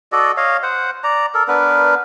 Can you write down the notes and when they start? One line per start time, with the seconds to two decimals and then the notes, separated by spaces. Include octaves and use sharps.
0.12 F#4 A4 D5 D#5
0.37 C#5 D#5 F5
0.63 C5 F#5
1.04 D5 A#5
1.34 A4 A#4
1.48 B3 D4 A#4 B4